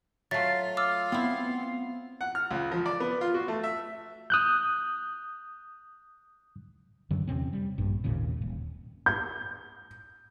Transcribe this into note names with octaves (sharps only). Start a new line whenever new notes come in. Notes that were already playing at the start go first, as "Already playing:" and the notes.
F#3 A3 F4 E5 F5 A6
D6 E6 F6
B3 C4 E4
F#5
F6
C#2
F3
D5
B3
F4
F#4
A3
E5
D#6 F#6 G6
F#2 D3 D#3 F#3
E2 C3 C4 C#4
G3
A#1 G2
G#1 D#2 A#2 C#3
D#1
G6